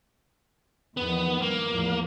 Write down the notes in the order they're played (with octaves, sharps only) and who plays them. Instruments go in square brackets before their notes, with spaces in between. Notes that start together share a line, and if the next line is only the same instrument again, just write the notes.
[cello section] E2 D#3 F3 [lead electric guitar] B3
[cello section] G2 [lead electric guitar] A#3
[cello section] E2 A2 F3